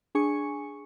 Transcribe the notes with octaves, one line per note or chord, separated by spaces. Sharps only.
D4 G#4 G#5 C#6 C#7